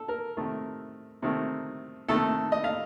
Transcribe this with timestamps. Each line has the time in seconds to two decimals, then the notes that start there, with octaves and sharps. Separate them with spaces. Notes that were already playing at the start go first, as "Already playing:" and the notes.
Already playing: A4
0.08 A#4
0.37 C3 D#3 A3
1.22 C3 D#3 A3
2.08 C3 D#3 A3 A4
2.52 D#5
2.64 F5